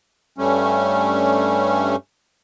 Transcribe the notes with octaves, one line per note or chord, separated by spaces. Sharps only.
G2 G3 A3 C#4